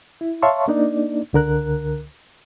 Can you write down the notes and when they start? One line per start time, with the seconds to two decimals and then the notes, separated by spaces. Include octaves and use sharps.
0.21 E4
0.42 C#5 E5 F5 A5 C6 C#6
0.68 A#3 D4 D#4 D5
1.33 C#2 D3 A#4 F#6